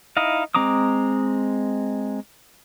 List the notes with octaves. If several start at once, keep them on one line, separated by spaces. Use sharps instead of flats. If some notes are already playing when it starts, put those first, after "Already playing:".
D#4 E4 D#5 F5
G#3 C4 A#5 D6 D#6